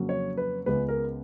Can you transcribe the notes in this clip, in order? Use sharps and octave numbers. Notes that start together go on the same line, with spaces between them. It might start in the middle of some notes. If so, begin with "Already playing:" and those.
Already playing: F2 C#3 F#3 A#3
C#5
B4
C#2 C#3 G#3 B3 B4
A#4